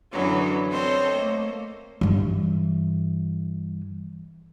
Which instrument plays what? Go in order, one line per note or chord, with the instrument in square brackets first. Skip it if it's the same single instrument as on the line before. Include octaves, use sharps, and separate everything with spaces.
[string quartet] F#2 D3 E3 F#3 B3 C#4
C4 A4 C5 C#5 D#5
A3 A#3
[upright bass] G2 E3